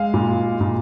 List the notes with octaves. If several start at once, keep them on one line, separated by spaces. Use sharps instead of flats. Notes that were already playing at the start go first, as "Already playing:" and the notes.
Already playing: G#3 F5
A#2
A#2